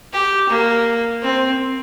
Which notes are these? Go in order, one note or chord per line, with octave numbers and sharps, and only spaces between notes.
G4
A#3
C4